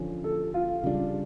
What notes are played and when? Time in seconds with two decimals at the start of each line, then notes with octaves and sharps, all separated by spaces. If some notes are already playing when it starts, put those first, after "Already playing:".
Already playing: D3 F3 C#4
0.24 A4
0.54 F4
0.83 C#3 G3 D4